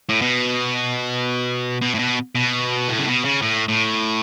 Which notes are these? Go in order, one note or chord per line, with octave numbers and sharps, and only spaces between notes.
A2
B2
B2
A2
B2
B2
A2
C#3
B2
C#3
A2
A2